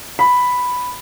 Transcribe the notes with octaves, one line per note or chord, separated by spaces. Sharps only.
B5